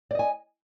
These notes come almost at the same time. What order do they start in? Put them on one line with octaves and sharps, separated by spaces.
D5 D#5 G#5